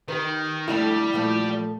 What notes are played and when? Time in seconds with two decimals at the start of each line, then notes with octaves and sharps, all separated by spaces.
0.08 D#3 G4 B4
0.68 F2 D3 G3 A3 E4
1.13 A#2 F3 A3